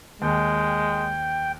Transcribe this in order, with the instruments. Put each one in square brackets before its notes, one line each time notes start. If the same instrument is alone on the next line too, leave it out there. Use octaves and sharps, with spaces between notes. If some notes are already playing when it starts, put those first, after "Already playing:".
[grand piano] D#2 [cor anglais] G#3 [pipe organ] G5